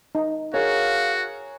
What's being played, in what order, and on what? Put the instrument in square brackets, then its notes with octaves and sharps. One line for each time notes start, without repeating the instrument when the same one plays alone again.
[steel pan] D#4
[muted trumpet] F#4 [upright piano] G#4 A#4 C#5 [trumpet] F5